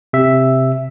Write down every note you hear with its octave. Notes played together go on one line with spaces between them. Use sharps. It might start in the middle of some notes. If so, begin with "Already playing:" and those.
C3 E5